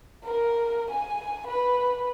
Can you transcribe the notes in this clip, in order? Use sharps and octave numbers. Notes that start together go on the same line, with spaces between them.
A#4
G#5
B4